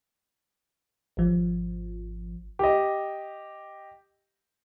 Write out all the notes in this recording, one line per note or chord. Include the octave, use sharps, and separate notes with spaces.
G#1 F3
G4 D#5